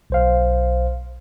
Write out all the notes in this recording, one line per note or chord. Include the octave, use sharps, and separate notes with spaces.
B1 C5 F5